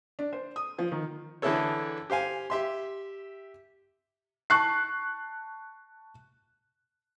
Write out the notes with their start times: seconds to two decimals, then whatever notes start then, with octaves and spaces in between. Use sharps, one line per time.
0.19 D4
0.33 C5
0.56 D#6
0.78 F3
0.92 D#3
1.42 D3 E3 E4 G#4 A4 C#5
2.10 G4 C5 F5 G#5
2.50 G4 E5 C6
4.50 A5 C#6 F#6 C7